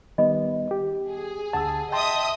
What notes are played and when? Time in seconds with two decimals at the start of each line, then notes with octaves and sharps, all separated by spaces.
0.18 D#3 G3 B3 D#5 B5
0.71 G4
1.10 G#4
1.53 D2 D3 F#5 A5 E6
1.92 D#5 E5 G5 A5 C6 D#6